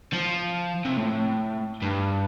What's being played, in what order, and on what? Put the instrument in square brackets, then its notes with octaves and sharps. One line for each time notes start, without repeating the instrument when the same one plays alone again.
[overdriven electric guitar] F3
C3
A2
G2